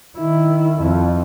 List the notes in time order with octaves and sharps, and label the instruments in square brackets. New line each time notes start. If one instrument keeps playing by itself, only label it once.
[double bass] D#3 E4
F2